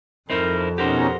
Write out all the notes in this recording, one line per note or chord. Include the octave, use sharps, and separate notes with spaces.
F2 C4 D#4 E4 A#4
B2 C#4 D#4 G4 A#4 C5 F#5